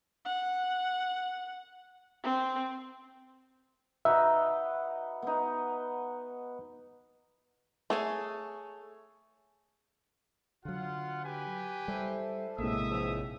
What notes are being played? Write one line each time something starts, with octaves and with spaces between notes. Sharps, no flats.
F#5
C4
D#4 F#4 B4 E5
B3 D#4
A3 G#4 C#5 G#5
D3 F#3 F4 F#5
G4 B4 G#5
G3 E4 A4 C5
A#1 A2 C3 G#3 A#3 E5 D#6
C#2 G#2 F3